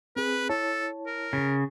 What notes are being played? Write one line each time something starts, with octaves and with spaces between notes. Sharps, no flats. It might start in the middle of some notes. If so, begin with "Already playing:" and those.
C4 G#4 B4
E4 A4 C#5 A5
A#4
C#3